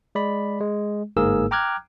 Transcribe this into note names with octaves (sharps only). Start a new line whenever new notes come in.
G#3 D5 B5
G#3
G1 G#2 A#3 G#4 A#4 E6
G5 A#5 D6 F6 F#6 G#6